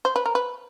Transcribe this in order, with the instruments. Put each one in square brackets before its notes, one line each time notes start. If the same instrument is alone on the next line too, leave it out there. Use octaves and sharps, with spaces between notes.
[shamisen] C5
B4
A#4
B4